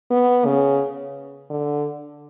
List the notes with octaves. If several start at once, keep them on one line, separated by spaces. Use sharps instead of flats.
B3
C#3
D3